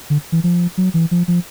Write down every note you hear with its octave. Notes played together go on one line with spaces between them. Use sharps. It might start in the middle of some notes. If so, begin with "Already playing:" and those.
D3
E3
F3
F#3
E3
F3
F3